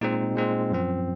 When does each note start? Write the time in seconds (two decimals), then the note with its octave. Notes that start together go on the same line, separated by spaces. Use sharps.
0.01 A#2 G#3 C4 D#4
0.36 A#2 G#3 C4
0.72 F#2 F3 C4